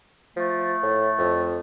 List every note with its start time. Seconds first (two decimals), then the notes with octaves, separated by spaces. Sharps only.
0.36 F3 A3
0.83 A2
1.18 F2